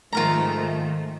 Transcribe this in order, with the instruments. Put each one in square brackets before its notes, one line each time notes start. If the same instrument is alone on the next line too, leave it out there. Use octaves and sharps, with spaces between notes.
[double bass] G#2 F3 [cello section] D#3 A3 [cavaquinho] F4 A#4 A#5